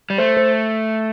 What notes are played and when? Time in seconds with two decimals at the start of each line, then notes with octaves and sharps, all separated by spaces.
0.10 G3
0.18 A3 C5
0.37 C5